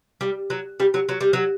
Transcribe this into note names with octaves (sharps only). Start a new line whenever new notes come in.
G3
F#3
G3
F#3
F#3
G3
F#3